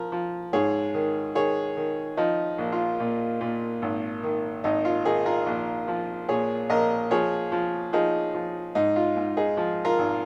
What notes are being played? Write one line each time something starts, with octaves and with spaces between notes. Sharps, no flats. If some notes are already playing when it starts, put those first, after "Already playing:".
Already playing: F3 A#4
F3
G#2 G#4 C#5
D#3
D#3 G#4 C#5
D#3
F3 D#4
A#1
F4
A#2
A#2
G#1
D#3
G#1 D#4
F4
D#3 D#4 G#4
F4 A#4
A#1
F3
A#2 G#4 C#5
A#1 A#4 D#5
F3 G#4 C#5
F3
F3 D#4 G#4
F3
G#2 D#4
F4
G#2
D#4 G#4
F3
F4 A#4
G#1